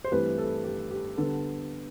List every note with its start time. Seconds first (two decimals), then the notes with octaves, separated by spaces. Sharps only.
0.04 C5
0.11 G2 E3 A3 C4 G4 B4
0.38 A4
0.64 G4
0.91 G4
1.17 D3 G3 B3 A4